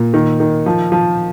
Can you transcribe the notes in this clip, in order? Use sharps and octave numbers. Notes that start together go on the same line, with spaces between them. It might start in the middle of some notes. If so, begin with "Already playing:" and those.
Already playing: A#2
D#3
D#3
F3
F3